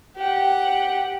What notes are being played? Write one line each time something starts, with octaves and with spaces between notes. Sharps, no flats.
G4 F#5